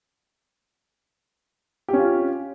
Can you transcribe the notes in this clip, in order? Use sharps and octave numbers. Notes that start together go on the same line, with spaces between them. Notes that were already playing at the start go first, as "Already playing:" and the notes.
C#4 F4 G4